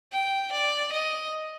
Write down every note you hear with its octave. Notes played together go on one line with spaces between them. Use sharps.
G5
D5
D#5